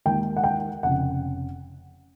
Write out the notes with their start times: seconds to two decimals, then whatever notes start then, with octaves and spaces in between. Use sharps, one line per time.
0.05 D#2 D#3 G#3 G5
0.36 F#5
0.44 G5
0.83 F1 C#3 F#5